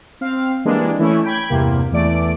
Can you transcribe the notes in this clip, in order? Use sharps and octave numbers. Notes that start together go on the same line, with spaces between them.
C4 F5
E3 G3 G#3 A#3 D4
E3 A3 C#4 E4
G5 B5 G#6
E2 G2 C3 A#3
E2 E3 A3 D5 D7